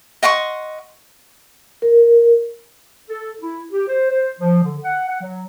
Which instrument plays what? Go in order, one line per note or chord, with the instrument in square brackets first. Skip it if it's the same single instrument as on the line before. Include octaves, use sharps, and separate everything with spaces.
[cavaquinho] D#5 F#5 C6 C#6
[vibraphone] A#4
[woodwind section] A4
E4
G4
C5
C5
F3
D3
F#5
F#5
F#3